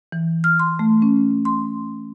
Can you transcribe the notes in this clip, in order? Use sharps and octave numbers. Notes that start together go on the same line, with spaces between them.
E3
F6
C6
A3
C#4
C6